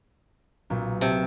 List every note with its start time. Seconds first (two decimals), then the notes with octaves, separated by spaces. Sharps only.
0.70 B1 A#2
1.01 C3 A5